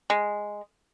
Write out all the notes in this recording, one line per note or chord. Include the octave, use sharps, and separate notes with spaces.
G#3